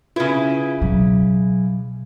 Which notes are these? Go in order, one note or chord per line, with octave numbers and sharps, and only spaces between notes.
C#3 E4 F4 B4
B2 F#3